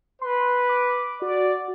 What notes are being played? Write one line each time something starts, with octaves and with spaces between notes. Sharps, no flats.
B4 C6
D6
F#4 D5